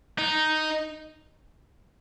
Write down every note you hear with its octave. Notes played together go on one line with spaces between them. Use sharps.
D#4